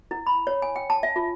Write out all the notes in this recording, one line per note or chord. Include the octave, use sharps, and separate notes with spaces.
E4
B5
C#5
G#5
G5
A5
E5
F4